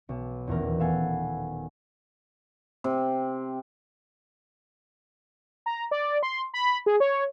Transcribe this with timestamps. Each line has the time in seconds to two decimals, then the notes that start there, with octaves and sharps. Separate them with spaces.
0.09 B1
0.47 D#1 E2 E3 A#4
0.79 B3 A4 F5 F#5 G#5
2.84 C3
5.66 A#5
5.91 D5
6.23 C6
6.54 B5
6.86 G#4
7.00 C#5